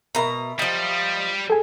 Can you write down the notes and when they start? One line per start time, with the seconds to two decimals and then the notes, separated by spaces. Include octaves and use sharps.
0.15 B2 A#4 E5 A#5 B5
0.59 F3 G3 D#5
1.50 G#4 A4 G#5